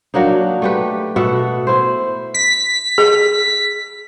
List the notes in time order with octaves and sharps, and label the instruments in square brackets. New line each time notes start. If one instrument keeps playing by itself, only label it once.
[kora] F#3 A#3 D4 D#4
A3 G4 B4
B2 A4 E5 F#5
E4 C5
[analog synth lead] B6
[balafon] G#4